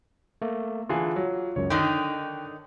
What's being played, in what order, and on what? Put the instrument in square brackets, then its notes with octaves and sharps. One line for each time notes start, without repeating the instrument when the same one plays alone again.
[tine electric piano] A3 A#3
[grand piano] D3 E3 G#4 [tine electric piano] F4
[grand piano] F#3
[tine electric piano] C#2 F#2 [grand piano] C#5
[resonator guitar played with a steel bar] D3 D#3 D#4 [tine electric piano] G5 C#6 F#6